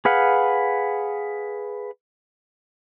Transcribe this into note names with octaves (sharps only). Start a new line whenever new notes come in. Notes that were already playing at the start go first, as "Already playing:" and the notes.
G#4 B4 F5 F#5